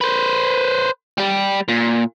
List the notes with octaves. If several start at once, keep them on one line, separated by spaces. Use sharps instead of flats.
B4 C5
G3 G4
A#2